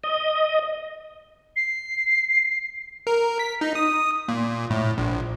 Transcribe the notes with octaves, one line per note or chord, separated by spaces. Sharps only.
D#5
C7
A#4
B6
D#4
D#6
A#2
A2
A#1